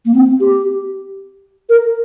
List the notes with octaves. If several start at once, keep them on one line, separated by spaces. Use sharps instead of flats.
A#3
C4
G4
A#4